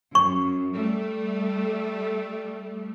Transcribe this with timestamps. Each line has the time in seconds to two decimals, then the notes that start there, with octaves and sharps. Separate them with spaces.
0.15 F#2 C#6
0.75 G3 A3